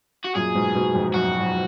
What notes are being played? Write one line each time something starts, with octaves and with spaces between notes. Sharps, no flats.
F#4
F#2 A#2 G#4
G#2 B2
G#2 B2
F2 G#2
F#2 F#4
F#2